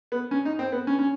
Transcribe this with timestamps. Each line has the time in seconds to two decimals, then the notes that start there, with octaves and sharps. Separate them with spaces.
0.12 B3
0.31 C#4
0.45 D#4
0.59 C4
0.72 B3
0.87 C#4
0.99 C#4